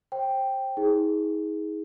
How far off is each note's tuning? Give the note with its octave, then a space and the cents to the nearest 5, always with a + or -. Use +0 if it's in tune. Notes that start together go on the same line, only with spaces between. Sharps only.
C5 +30 G5 +0
D#4 +45 G#4 +0